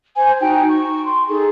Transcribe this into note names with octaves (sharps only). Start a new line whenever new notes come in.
C5 G#5
D#4 F#4 G5
C#6
C6
D#4 G#4 A4